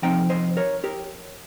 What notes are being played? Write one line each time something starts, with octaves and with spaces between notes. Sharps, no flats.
F2 C3 F3 C4 D#4 G5 A#5
C5 D#5
A#4 C#5
G4 A#4